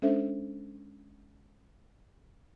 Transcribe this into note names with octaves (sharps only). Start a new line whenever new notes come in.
G#3 C#4 D4 A4 C5 E5